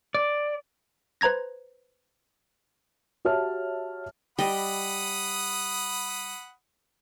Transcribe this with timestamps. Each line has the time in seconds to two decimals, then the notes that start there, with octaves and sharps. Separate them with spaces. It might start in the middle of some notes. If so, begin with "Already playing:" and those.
0.15 D5
1.21 B4 C5 A#5 G#6 A#6
3.25 F#4 G4 C#5 E5 A5 F6
4.39 G3 D#5 F#5 B5 D#6